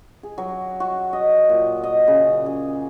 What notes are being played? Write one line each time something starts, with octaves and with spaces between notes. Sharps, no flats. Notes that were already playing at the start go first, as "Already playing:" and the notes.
G#4
F#3
F#4
D#5
A#2
D#5
C#3
G#4